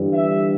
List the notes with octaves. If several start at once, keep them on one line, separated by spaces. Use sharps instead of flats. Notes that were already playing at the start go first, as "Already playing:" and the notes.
Already playing: G1 G2 E3
E5